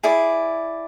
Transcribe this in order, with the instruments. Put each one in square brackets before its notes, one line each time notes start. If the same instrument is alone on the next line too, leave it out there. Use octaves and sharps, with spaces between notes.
[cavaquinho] E4 G#4 D5